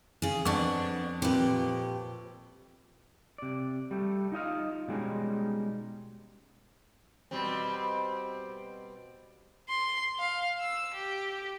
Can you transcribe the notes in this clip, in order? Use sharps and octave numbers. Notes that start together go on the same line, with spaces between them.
C#3 G#4
F2 B3 D4 C#6
A#2 C4 G4 B4
C3 D5
G3 A3
D#4 F4 D#5 F5
B2 G3 G#3 C#4 D#4
B2 G3 C4
C6
F5
E6
G4